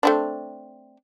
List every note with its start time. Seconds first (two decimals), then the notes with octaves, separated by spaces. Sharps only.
0.03 A3 C4 D4